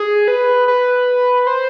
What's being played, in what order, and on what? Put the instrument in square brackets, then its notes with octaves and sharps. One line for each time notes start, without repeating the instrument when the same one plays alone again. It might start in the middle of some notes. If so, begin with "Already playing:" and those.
Already playing: [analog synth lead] G#4
B4
B4
C5